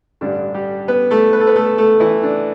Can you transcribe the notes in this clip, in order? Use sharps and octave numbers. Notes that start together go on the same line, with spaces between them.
A1 G2 D3 G3 D4
G3 G4
B3 B4
A3 A4
B4
A4
B3 B4
A3 A4
A3 A4
E3 E4
D4